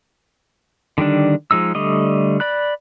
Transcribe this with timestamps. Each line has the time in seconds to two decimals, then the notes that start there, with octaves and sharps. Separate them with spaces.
0.98 D3 D#3 G3 D4
1.51 F3 G#3 D#4 E6
1.75 D3 G3 A3 D#5
2.40 D5 B5 F#6